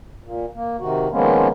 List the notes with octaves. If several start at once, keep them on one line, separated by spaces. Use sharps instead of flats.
A#2
A#3
C3 D#3 F#4
D#3 F3 G#3 A#3 B3 C#4